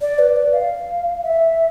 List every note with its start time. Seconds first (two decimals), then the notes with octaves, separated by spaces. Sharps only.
0.01 D5
0.19 B4
0.36 D5
0.53 F5
1.23 E5